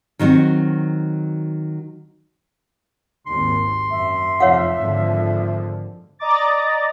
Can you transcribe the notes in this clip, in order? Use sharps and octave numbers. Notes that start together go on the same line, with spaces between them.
D#3 F#3 C4 F#4
G#1 D#2 C6
F#2 E5
F1 F3 C#5 F5 F#5
G#1 D3 F3
D5 D#5 A#5 D6 A6